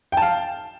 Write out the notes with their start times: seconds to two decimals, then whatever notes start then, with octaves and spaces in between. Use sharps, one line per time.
0.12 G5
0.17 A5
0.22 F5